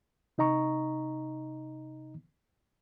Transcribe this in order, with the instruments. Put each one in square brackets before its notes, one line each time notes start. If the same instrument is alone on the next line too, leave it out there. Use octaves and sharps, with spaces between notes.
[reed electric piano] C3 D#4 D#5 A#5 C#6